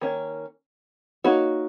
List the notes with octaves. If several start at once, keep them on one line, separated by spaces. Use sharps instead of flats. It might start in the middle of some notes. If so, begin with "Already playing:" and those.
D#3 A#3 C#4
A#3 D#4 F#4 C#5